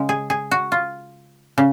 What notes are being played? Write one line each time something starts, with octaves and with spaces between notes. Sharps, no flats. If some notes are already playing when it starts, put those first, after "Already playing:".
Already playing: C#3 G#3
G#4
G#4
F#4
F4
C#3